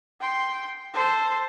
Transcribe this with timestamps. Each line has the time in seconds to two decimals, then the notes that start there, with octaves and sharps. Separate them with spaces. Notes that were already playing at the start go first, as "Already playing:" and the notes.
0.21 G5 C6
0.94 A4 C5